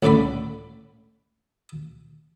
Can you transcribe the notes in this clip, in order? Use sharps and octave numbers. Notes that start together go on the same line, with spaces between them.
C#2 A2 D3 D5 B5